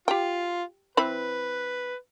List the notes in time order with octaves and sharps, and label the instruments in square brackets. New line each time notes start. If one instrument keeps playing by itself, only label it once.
[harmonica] F4 [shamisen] G4 G5
[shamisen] E3 C4 B5 [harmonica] B4